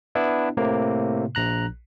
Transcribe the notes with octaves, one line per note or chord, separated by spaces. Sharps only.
B3 D4 E4
A2 C3 A#3
A#1 A#5 F#6